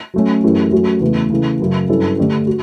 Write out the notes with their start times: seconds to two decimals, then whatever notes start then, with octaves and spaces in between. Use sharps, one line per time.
0.14 F#3 A3 C#4
0.43 F#2 E3 A3 C#4 G4
0.72 F#3 A3 C#4 F#4
1.01 E2 C#3 E3 A3
1.30 C#3 E3 A3
1.60 F#2 C#3 F#3
1.89 G2 F#3 C#4 E4 A4
2.18 D3 A3 D4 G4
2.47 F#4